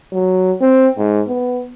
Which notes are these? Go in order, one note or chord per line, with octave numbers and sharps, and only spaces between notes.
F#3
C4
G#2
B3